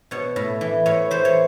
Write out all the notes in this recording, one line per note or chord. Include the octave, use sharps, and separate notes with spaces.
B2 C#5
A2
E3
A2 C#5
E3 C5
C#5